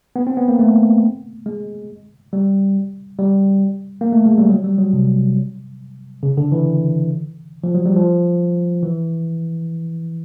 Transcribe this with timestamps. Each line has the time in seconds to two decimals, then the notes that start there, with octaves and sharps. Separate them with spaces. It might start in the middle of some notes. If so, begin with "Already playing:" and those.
0.16 B3
0.27 C4
0.37 B3
0.48 A#3
0.59 A3
1.46 G#3
2.33 G3
3.19 G3
4.01 A#3
4.13 A3
4.26 G#3
4.38 G3
4.50 F#3
4.64 G3
4.78 F#3
4.93 C3
6.23 C#3
6.37 D3
6.52 E3
7.64 F3
7.74 F#3
7.86 G3
7.96 F3
8.83 E3